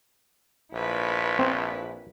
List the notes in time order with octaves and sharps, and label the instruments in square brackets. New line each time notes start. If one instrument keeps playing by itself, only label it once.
[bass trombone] A#1 [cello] E4 B4
[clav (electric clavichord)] C4